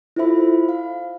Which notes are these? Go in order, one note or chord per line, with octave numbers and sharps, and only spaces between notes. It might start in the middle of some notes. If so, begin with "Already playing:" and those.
E4 F4 A4 C5 E5 B5
F5